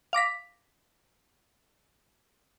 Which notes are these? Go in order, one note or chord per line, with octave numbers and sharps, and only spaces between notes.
F5 D6 A#6 B6